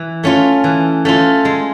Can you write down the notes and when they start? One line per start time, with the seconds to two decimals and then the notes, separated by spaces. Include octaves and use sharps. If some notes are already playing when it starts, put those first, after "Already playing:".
Already playing: E3
0.24 A3 C#4 F4
0.64 E3
1.05 A3 C#4 F4
1.45 G#3